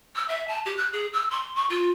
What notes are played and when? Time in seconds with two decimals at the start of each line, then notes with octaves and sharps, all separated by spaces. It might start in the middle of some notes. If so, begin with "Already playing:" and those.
0.16 E6
0.28 E5
0.48 A5
0.65 G4
0.77 F#6
0.93 G#4
1.13 E6
1.31 C6
1.55 C#6
1.70 F4